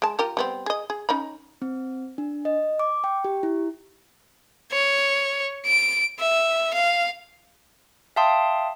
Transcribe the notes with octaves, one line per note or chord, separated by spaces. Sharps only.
G#3 A5
F4 G4 A#4
G3 B3 C4
G#4 D#5
G#4
C#4 D#4 B5
C4
D4
D#5
D6
G5
G4
E4
C#5
D7
E5
F5
E5 F5 G5 A5 C6 D#6